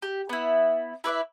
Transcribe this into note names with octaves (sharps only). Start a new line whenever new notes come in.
G4
B3 E4
E4 B4 D5 E5